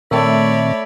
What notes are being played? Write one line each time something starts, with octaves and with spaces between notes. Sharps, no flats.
A#2 D#3 A3 C4 C#5 D5 E5 B5